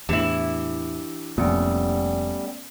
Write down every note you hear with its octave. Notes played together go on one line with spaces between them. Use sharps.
E2 A2 E3 D4 E4 G4
F1 F2 A#2 G3 A3 B3 C#4